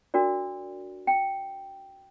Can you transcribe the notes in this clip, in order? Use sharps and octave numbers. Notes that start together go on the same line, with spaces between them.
D4 F#4 A#4 D5
G5